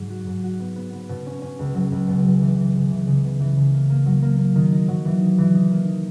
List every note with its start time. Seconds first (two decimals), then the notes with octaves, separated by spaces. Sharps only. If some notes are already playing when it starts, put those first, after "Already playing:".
Already playing: G#2 F#3
0.10 F#4
0.27 G#2
0.43 F#4
0.60 B3
0.76 B3
0.93 B3
1.09 B2
1.26 C#4
1.42 C#4
1.59 C#2
1.75 F#3
1.92 C#2
2.07 B2
2.25 F#3
2.41 E3
2.57 E3
2.75 C#3
2.90 E3
3.07 C#3
3.24 B3
3.40 E3
3.57 C#3
3.73 A#3
3.90 A#3
4.06 F#3
4.22 A#3
4.39 A#3
4.55 D#3
4.72 D#4
4.88 F#3
5.05 E3
5.21 D#4
5.38 E3
5.55 D#4
5.71 A#3
5.88 D#4